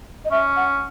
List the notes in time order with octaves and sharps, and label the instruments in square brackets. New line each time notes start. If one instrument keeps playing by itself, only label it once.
[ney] D#5
[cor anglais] C#4 [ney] E5
[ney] F#5